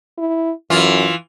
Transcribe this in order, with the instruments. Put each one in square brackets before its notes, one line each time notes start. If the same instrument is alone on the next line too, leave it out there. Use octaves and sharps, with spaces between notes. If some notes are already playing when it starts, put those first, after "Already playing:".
[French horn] E4
[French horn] F#2 [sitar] E3 F4